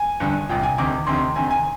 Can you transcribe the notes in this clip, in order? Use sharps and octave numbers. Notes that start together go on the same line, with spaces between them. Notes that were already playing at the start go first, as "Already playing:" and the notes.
Already playing: G#5
G1 G2 D3
C2 A#2 G5
G#5
D2 C3 D#3 D6
D2 C3 D#3 C6
D2 C3 D#3 G#5
G#5